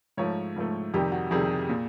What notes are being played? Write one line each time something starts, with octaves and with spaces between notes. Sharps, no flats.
G#2 F3 A3 C#5
G#2 F3 A3
F2 C3 D#3 G3 G4
F#4
F2 C3 D#3 G3 G#4
A#2